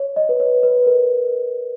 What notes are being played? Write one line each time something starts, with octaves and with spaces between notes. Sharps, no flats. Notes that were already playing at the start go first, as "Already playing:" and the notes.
Already playing: C#5
D#5
B4
C#5
B4
A#4